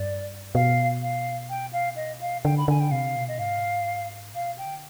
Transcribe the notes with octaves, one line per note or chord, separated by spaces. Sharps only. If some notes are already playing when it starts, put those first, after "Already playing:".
Already playing: G2 D5
B2 F5
F5
G5
F5
D#5
F5
D3 G5
B5
D3 G#5
G5
C3 F5
B2
D#5
G#2 F5
B2 F5
G5
D3